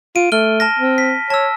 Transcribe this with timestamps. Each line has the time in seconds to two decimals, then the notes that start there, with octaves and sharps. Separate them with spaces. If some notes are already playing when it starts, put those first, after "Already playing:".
0.16 F4 D7 D#7
0.32 A3 F6 G7
0.60 A5 F6 A#6
0.79 C4
0.98 B6
1.30 C#5 A5 E6